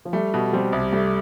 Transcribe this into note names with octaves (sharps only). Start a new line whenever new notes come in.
F3
G3 A3
B2
G3 C4
C2
G3 A3